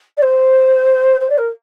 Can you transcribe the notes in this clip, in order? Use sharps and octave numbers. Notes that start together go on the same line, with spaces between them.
D5
C5
C5
D5
A#4